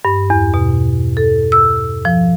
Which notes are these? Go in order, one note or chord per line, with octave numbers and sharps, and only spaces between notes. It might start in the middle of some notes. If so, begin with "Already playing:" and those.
G2
E2
B2
A4
E6
F3